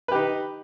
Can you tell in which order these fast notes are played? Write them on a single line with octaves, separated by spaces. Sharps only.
B4 G4 D#4